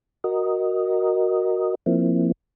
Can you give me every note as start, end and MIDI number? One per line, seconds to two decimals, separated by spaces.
0.24 1.75 66
0.24 1.75 70
0.24 1.75 75
1.86 2.32 53
1.86 2.32 58
1.86 2.32 60
1.86 2.32 64